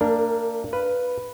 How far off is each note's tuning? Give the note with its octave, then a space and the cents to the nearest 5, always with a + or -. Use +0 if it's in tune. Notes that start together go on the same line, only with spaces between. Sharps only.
A#3 -40 D4 -5 A#4 -10
B4 +0 F5 +0